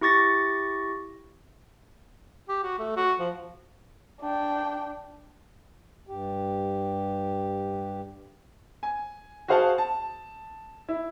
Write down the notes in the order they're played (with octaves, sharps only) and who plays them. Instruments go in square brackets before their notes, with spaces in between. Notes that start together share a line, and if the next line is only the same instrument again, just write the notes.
[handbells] E4 G4 C#6 A6 A#6
[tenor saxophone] G4
F#4
A3
F#4
F3
[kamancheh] D4 G5
[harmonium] G2 G4
[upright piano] G#5
F#4 G#4 C5 F5 F#5 A5
A5
E4